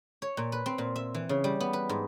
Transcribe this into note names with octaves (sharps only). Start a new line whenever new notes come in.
C#5
A#2
B4
C4
A#2
E5
E3
C#3
G3
B3
B4
G#2